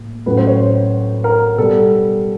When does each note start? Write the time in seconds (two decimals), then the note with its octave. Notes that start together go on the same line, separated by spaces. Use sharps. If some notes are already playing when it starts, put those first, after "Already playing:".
Already playing: A2 A#3
0.26 A2 F#3 A3 C#4 B4
0.37 C5
0.47 C#5
0.59 C5
1.24 A#4
1.58 B2 G3 B3 A4